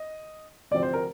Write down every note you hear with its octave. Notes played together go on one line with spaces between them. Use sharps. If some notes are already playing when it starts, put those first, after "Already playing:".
Already playing: D#5
D2 C3 F3 C4 D5
C5
A#4